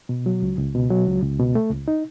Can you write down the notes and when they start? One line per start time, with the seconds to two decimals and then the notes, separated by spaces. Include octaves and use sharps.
0.09 B2
0.26 F#3
0.42 C#2
0.59 C#2
0.75 B2
0.90 F#3
1.07 C#2
1.22 C#2
1.39 B2
1.55 A3
1.70 C#2
1.88 D#4